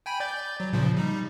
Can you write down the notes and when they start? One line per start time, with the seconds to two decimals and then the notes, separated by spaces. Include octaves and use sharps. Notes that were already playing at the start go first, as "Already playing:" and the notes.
0.06 G5 G#5 B5
0.20 D5 G6 A6
0.60 F#3
0.73 A#2 C#3 F3
0.97 G3 D#4